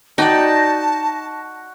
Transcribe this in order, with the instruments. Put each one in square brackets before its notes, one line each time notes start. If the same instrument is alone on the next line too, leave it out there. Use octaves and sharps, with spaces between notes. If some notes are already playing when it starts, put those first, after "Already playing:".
[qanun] D#4 [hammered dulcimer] F#4 [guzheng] D5 D#5 G5 [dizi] A5